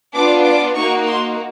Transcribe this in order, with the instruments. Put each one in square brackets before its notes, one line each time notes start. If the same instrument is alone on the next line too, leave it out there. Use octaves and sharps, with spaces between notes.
[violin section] B3 D4 F4 D6
D6
A#3 D#4 F#4 C#6
C6